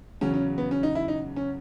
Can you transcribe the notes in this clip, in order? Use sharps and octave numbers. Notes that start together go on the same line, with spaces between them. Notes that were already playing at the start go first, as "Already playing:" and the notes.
E2 C#3 F#3 C#4
C#4
B3
C#4
D#4
E4
D#4
C#4